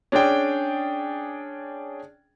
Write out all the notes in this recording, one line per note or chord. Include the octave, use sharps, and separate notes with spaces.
C#4 D4 G#4 D5 G5